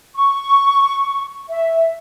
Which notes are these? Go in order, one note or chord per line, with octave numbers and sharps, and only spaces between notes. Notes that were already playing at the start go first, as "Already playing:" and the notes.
C#6
E5